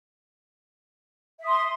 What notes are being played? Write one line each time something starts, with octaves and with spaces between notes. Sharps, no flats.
E5 C6 D#6